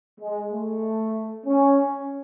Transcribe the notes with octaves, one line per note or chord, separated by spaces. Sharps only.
G#3
A3
C#4